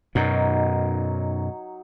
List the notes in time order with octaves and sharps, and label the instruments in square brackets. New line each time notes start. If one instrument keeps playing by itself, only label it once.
[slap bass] F#2 B2 [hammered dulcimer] F#3 D#4 C#5